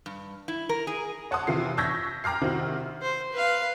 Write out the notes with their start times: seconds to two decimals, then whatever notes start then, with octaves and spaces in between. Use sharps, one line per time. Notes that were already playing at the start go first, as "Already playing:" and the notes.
0.06 G2
0.48 E4
0.69 A#4
0.87 G#4
1.31 C#5 F#5 A5 C6 D#6
1.47 C3 E3 F4 C7
1.77 C#6 E6 G6 G#6 A#6 B6
2.24 G5 A#5 D6 F6 C7
2.41 C3 D#3 C4 E4 F#4
3.02 C5
3.33 B4 F5